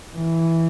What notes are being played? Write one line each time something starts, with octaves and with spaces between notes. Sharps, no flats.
E3